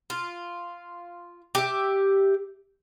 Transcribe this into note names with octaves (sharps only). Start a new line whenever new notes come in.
F4
G4 E5